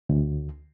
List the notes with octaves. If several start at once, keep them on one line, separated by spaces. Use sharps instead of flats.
D2